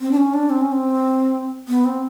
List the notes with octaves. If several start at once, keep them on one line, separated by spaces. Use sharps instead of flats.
C4
D4
C#4
D4
C4
C#4
C4
B3
C4